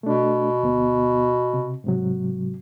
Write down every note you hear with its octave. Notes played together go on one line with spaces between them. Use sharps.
B2 A3 D4
D2 B3
C3
G#2 C3 F#3